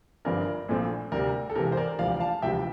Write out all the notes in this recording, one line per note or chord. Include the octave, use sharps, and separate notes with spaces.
G1 G2 F3 C4 A#4 D5
A#1 A#2 F3 A3 C4
D2 C3 G3 A#4 D5
A4
E1 E2 C3 A#4
C5
A#4 D5
E1 D2 C3 F3 D5 F5
F5 A5
E1 D2 C3 F3 E5 G5